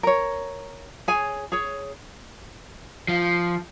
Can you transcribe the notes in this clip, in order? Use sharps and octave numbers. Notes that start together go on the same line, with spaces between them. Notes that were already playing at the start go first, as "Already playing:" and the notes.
A#4 C#5
G#4 C#5 G#5
G#4 C#5
F3